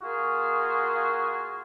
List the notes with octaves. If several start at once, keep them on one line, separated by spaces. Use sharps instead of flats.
A#3 F4 F#4 G#4